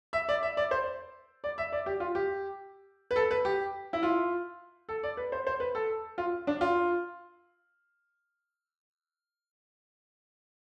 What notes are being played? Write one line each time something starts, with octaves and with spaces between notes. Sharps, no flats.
E5
D5
E5
D5
C5
D5
E5
D5
G4
F4
G4
B4
A4
B4
G4
E4
F4
A4
D5
B4
C5
C5
B4
A4
F4
D4
F4